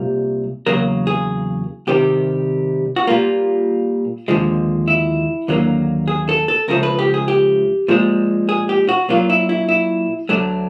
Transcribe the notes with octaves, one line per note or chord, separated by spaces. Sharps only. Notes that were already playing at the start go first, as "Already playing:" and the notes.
Already playing: C2 A#2 G3 A#3
E2 C#3 F#3 A#3 A#4
G#4
C2 C3 D#3 G3 G4
F#4
A#2 G3 A#3 F4
D#2 D3 F3 G#3
E4
D#2 D3 F#3 A#3
G#4
A4
A4
C#2 C#3 F3 A3 A#4
B4
G4
G#4
G4
A#2 F3 G#3
G#4
G4
F#4
A#2 F#3 A#3 F4
E4
E4
E4
D2 D3 F#3 A3 D4